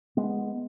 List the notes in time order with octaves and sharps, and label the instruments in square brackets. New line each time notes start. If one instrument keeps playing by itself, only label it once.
[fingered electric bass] G#3 B3